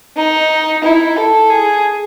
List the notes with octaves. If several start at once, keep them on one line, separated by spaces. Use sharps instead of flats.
D#4
E4
A4
G#4